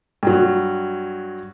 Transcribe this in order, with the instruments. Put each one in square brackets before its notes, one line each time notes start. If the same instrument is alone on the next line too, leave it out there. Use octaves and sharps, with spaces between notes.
[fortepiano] G2 F#3